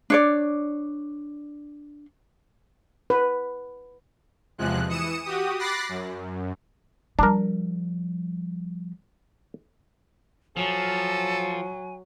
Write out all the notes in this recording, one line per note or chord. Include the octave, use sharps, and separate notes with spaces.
D4 C#5 D5
B4
E2 C3 F3 G#3 F#6
E3 D#6 C#7 E7
F#4 G4 D#6
B5 D6 F#6 A6 A#6 C7
F#2
F3 G3 D4 A#4
F3 F#3 A4 G#5